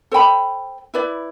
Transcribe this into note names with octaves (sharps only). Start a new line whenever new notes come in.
A4 C5 G5 B5
E4 B4 D5